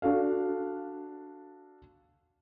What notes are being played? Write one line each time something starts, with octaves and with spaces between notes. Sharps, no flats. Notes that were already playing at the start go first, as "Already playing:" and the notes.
D4 F#4 A4 F5